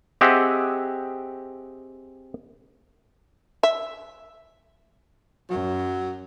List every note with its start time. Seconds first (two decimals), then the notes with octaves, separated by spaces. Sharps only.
0.21 C4 G4 G#4 D#5 E5 F#5
3.63 E5
5.50 F#2 F#3